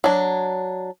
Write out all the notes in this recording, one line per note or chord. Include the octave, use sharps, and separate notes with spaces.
F#3 D4